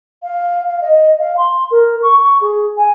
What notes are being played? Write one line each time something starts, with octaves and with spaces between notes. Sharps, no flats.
F5
F5
D#5
F5
C6
A#4
C#6
C#6
G#4
G#5